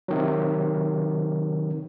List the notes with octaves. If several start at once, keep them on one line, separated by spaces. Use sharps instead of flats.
C3 D#3 F#3